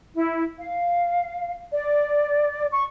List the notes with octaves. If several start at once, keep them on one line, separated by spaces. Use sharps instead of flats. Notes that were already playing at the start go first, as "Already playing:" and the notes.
E4
F5
D5
C#6